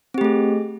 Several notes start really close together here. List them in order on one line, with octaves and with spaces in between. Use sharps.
C4 G4 A3 G#4